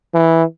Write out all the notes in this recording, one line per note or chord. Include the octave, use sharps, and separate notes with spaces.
E3